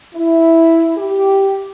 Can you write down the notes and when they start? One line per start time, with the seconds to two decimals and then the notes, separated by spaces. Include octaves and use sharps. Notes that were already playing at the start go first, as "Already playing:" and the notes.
0.15 E4
0.97 G4